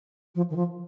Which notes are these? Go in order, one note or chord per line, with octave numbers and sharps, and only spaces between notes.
F3
D#3
F3